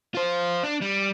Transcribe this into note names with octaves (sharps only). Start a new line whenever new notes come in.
F4 C5
D4
G3